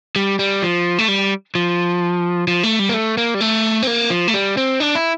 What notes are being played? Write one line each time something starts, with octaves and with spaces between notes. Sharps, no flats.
G3
G3
F3
A3
G3
F3
F3
A3
G3
A#3
A3
A#3
G3
A3
C4
A#3
F3
A3
G3
C4
D4
E4